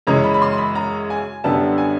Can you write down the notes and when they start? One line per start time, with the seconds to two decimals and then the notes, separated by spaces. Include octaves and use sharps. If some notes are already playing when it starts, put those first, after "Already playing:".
0.07 F#2 C#3 E3 G#3 C#4 A#5
0.24 B5
0.34 B5
0.42 C6
0.58 B5
0.75 A#5
1.10 G#5
1.44 F#2 D3 G3 B3 A5
1.78 G#5